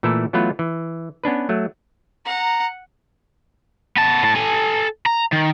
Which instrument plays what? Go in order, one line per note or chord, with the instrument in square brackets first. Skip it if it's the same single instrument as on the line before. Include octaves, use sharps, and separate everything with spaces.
[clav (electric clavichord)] A#2 E3 A3 E4 A4
E3 F#3 A3 B3 F4 B4
E3
B3 C#4 D4 B4
F#3 A3
[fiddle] F#5 [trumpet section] A#5
[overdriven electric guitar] B3 A5
A2 A5
A4 G#5
A#5
D#3